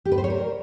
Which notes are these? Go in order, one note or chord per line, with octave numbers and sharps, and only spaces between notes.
G4
B4
C5
C#5
A#4